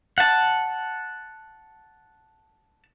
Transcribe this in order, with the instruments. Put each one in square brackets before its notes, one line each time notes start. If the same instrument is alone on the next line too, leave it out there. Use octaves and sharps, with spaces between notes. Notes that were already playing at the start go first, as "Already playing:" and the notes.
[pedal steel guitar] F#5 A5